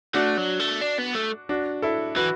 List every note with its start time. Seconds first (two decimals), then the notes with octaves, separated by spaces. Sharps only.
0.14 A3 D4 F#4
0.37 F#3
0.60 A3
0.81 D4
0.99 B3
1.16 A3
1.49 D4 F#4
1.82 E4 A4
2.16 E3 F#4 B4